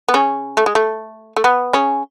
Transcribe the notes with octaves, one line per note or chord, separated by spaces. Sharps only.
B3
C#3 C#4
A3
G#3
A3
A3
B3
C#3 C#4